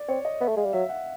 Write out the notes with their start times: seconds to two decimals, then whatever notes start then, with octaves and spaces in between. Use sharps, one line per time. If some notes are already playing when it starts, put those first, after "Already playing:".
Already playing: D5
0.08 C4 C#5
0.25 D#5
0.41 B3 E5
0.48 A3
0.57 G#3 F5
0.65 G3
0.73 F#3 E5
0.89 F#5